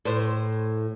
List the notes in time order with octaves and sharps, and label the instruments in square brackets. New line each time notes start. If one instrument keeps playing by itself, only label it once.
[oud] A2 C5